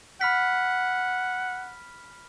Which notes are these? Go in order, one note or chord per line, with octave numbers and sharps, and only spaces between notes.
F#5 B5 F6 B6